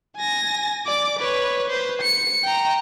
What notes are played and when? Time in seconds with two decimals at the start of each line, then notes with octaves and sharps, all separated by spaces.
0.17 G#5 A#6
0.86 D5 D6
1.19 B4 C#5
1.70 B4 C5
2.02 C#7
2.43 G5 A#5